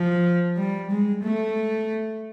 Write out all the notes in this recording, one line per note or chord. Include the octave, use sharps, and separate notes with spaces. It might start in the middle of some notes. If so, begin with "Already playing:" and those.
Already playing: F3
G3
G#3
A3